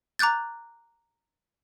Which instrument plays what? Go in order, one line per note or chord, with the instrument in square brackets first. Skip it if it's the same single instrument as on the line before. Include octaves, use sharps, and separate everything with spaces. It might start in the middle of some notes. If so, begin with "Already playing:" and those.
[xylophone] A#5 D6 F#6 G6 A6